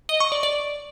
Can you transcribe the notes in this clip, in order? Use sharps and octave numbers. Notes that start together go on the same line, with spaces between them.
D#5
C#6
D5
D5